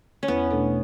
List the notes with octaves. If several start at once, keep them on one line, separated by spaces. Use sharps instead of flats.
C#4
E2 B3
B2 A3 D4 A4